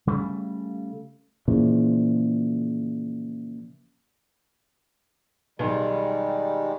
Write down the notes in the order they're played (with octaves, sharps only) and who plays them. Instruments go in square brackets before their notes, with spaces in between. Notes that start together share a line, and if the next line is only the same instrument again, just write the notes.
[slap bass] C#3 G3 A3
[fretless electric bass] A#2 C#3 E3 F3
[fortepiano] B1 [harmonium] D#3 G3 G#3